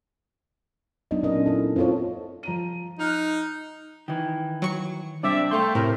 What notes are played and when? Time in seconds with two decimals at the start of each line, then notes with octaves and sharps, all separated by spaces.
1.11 F#3 B3 D4 D#4 D#5
1.23 A#2 C#4 D4 A#4 D#5
1.46 E4 A4
1.76 C4 E4 F4 A4 C#5
2.43 F3 A#5 D#7
2.99 D#4 F6 F#6
4.08 D#3 E3
4.62 F#3 C#6 C#7
5.23 C3 G3 D4 C5 D5 E5
5.51 A3 F5 G5 C6
5.75 A2 C3 E4 A#4